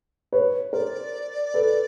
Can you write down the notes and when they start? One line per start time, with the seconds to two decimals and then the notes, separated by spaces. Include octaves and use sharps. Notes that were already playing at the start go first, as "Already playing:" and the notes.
0.33 B4 C#5
0.72 A#4 C5 D5
1.54 A4 B4